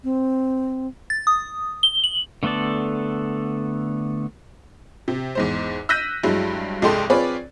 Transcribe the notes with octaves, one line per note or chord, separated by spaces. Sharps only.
C4
A6
D#6
G7
F#7
D3 A3 B3 A4 D5
C3
E2 G#2 C5
E6 F#6 G6 A#6 B6 D#7
G2 F#3 G#3 E4
C2 G2 G#3 A4 G5 C6
C4 F4 G#4 B4 C#5 D5